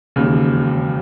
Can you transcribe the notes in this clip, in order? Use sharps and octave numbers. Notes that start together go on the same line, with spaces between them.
E1 D#2 C#3